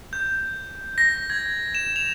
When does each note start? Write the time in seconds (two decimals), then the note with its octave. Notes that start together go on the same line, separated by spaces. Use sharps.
0.13 G6
0.98 A#6
1.30 G#6
1.75 E7
1.96 F7